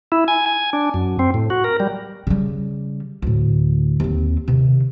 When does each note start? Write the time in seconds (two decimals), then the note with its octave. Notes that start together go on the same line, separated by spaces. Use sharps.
0.12 E4
0.28 G#5
0.46 G#5
0.73 D4
0.94 F#2
1.19 C4
1.34 A2
1.50 F#4
1.64 A#4
1.80 G3
2.27 C#3 G3
3.22 D2 A2
4.00 D#2 C4
4.48 C3 D#3